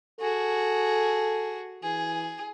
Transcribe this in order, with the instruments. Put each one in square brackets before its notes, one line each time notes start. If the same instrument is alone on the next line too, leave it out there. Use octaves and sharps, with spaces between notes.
[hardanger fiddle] F#4 G#4 [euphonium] A4
[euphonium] E3 [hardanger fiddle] G#4